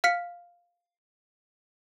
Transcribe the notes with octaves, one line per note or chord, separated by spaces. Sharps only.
F5 F6 B6 C#7